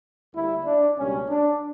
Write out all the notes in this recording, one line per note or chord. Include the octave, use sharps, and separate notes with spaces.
D2 D3 G3 A#3 E4
D4
C#2 B2 G3 A#3 C#4
D4